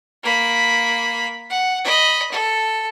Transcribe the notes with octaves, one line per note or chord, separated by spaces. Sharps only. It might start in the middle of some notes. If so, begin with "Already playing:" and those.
A#3 B5
F#5
D#5 B5
A4